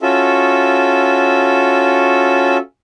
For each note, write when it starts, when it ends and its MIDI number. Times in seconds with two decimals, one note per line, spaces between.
0.02 2.57 61
0.02 2.57 65
0.02 2.57 66
0.02 2.57 69
0.02 2.57 76